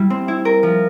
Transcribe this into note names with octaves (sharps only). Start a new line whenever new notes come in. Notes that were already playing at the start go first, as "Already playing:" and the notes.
Already playing: G3 E4
C4
E4
A#4
F3